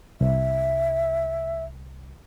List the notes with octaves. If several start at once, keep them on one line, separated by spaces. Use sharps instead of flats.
C2 E5